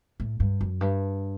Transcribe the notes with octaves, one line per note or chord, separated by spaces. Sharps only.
A2
G2
F#2
G2